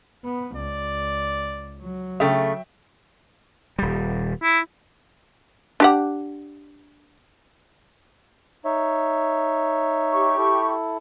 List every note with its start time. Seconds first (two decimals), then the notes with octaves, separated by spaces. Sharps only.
0.24 B3
0.57 C#2 D5
1.82 F#3
2.20 C#3 A3 E5 G5
3.79 D#1 G3
4.42 E4
5.80 D4 G4 F#5
8.65 D#4 C#5 E5
10.13 G4 C#6
10.38 E4 A4